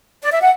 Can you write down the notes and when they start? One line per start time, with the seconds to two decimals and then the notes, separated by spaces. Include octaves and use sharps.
0.23 D5
0.32 E5
0.41 F#5